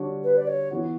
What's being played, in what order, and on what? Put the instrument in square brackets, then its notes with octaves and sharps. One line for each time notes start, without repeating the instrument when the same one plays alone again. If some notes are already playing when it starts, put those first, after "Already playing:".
Already playing: [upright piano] D3 G3 D4 F#4 C#5
[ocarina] B4
D5
C#5
[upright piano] E3 B3 F#4